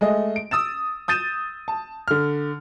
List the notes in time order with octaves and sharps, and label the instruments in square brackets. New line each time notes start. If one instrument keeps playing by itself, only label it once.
[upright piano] G#3 A3 D#5
D7
D#6 E6 A6 E7
D#6 G6 A6 D#7 E7
A5
D3 F6